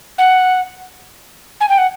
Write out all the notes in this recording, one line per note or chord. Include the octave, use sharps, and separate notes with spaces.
F#5
G#5
G5
F#5